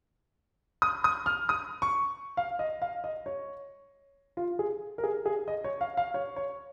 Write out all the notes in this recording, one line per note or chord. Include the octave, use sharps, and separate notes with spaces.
D#6
D#6
F6
D#6
C#6
F5
D#5
F5
D#5
C#5
F4
G#4
A#4
G#4
G#4
D#5
C#5
F5
F5
C#5
C#5